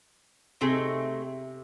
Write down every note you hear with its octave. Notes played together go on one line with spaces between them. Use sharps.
C3 A3 C4 D#4 G#4